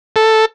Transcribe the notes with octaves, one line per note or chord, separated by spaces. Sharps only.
A4